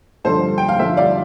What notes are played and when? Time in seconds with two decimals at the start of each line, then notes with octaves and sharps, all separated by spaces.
0.25 G2 D3 F3 A4 C5
0.58 G5
0.68 F5
0.79 G2 D3 F3 C5 E5
0.97 D5 F5